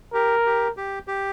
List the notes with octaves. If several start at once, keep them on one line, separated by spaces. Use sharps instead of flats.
G4 A#4
G4
G4
G4